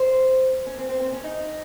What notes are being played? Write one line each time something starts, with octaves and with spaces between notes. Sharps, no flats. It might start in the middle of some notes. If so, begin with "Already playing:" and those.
Already playing: C5
C#4
C4
C4
C4
C#4
D#4